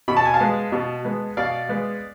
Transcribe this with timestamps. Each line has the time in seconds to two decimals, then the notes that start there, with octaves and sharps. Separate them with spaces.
0.08 B2 B5
0.17 A5
0.25 G#5
0.34 F5 A5
0.40 G#3 B3
0.72 B2
1.05 G#3 B3
1.37 B2 D5 F5
1.69 G#3 B3